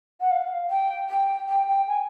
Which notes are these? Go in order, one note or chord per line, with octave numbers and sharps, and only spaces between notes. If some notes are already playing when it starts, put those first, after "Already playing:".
F#5
F5
G5
G5
G5
G5
G#5